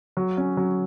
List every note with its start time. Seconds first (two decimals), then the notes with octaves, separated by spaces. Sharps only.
0.17 F#3
0.37 C#4
0.57 F#3